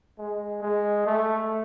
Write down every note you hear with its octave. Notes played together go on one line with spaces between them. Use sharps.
G#3
G#3
A3